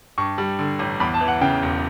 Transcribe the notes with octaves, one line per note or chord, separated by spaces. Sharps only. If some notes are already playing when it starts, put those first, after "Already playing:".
G2 C#6
G3
D3
A1
E2 B5
A5
E3
F#5
C#3 G5
E1